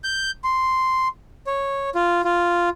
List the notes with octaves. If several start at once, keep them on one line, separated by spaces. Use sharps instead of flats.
G6
C6
C#5
F4
F4